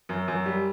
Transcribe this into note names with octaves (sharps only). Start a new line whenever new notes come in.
F#2
F#2
G3